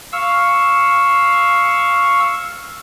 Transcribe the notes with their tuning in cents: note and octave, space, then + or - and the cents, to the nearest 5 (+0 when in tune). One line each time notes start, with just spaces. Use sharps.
F5 +0 C#6 +0 E6 +0